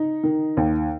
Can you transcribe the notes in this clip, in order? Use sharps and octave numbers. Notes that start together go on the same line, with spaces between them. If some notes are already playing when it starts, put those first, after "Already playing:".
Already playing: D#4
D#3
D#2